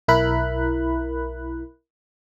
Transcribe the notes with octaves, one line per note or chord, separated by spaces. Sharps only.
B1 E4 A#4 B5 F#6